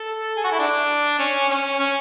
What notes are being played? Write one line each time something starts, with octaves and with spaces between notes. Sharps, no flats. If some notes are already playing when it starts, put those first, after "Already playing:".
Already playing: A4
G#4
F#4
E4
D4
C#4
C#4
C#4